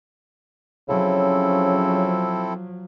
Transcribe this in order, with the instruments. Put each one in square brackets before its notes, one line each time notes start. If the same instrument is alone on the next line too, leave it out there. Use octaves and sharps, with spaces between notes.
[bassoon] C#3 [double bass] F3 F#3 [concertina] C4 E4 A4 [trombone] C#4